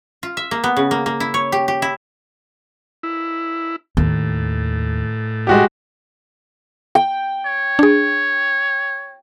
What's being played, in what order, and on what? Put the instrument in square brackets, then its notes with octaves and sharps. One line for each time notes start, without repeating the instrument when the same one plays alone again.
[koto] F4
E5
A#3
B3
C#3
A#3
A#3
E4
C#5
G4
G4
E4
[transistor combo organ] E4
[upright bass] D#2 [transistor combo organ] A2
[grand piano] G#3 F#4 G4
[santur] G5
[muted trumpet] C#5
[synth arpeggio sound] D4 G#4